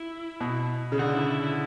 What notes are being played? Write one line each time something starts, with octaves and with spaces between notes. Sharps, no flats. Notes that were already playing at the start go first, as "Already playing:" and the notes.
Already playing: E4
B2
C#3
D3 F#4
D4
E4
E4
E4